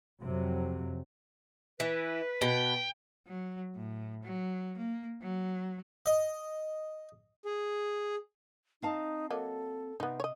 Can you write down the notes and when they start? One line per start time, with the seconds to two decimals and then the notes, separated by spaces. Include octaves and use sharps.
0.23 F2 C3 F#3
1.80 E3 B4
2.42 B2 G5
3.27 F#3
3.75 A2
4.23 F#3
4.77 A#3
5.22 F#3
6.06 D#5
7.44 G#4
8.82 C4 D#4 F5 A5
9.30 F#3 A#3 A4 D#5
10.00 C3 B3 D#4
10.20 C#5 D#5